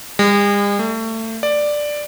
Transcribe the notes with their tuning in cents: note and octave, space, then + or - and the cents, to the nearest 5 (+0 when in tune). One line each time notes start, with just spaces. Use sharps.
G#3 -45
A3 +30
D5 +5